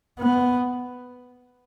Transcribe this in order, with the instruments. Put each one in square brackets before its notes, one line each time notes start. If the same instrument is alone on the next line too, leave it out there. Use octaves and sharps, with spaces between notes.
[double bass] B3